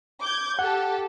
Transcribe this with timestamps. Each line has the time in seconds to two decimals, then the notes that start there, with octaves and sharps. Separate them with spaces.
0.22 D6 G6 G#6
0.59 G4 A4 F#5